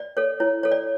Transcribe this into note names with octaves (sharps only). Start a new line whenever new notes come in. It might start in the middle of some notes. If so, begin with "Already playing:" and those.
Already playing: D5
A4 C#5
E4 C#5
A4 C#5
D5